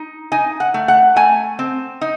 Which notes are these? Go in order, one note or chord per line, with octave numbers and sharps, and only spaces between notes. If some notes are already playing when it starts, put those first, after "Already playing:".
Already playing: D#4
D#4 G#5
F#5
A3
F#5
A3 G#5
C4
D#4